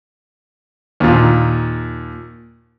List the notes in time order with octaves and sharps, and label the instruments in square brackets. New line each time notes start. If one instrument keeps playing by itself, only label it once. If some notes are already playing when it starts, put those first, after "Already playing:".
[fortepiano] D#2 A#2